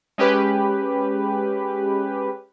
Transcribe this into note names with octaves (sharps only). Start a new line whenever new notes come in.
G#3 C#4 G4 B4